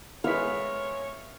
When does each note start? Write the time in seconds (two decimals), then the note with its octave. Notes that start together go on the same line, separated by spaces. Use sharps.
0.24 G#3 B3 C#5 E5 F5 B5 B6